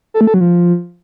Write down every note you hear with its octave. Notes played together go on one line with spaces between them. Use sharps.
A4
A3
A4
F#3
F3